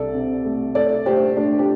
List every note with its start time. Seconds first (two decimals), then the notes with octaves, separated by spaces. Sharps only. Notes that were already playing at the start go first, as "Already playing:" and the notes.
Already playing: C2 A4 D5
0.14 C3
0.45 A3
0.75 A3 A4 D5
1.06 A3 G4 C5
1.37 A3 D4
1.59 G4